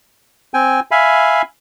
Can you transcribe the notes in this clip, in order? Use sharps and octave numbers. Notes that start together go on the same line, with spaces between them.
C4 G5 G#5
E5 F5 G#5 B5